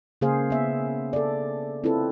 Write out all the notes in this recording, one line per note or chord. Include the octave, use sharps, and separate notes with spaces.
C#3 A#3 G#4 C5 F5
B3 E5
A4 D5
C4 E4 F4 A4 B4